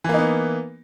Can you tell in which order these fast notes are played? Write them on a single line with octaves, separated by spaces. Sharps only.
E3 A#3 D#4 B3